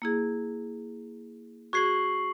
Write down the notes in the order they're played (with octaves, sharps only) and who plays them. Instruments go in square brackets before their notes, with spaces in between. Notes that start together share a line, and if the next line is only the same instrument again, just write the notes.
[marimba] A#3 E4 G#4
[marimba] F#4 G#4 G#6 [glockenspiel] C#6 C7 F#7